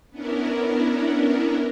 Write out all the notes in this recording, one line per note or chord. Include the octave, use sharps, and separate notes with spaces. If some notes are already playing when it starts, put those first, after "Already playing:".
B3 C#4 D4 E4 A#4